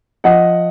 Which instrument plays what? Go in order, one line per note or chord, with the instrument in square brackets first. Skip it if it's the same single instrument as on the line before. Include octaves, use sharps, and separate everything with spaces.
[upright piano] F3 D#5 F#5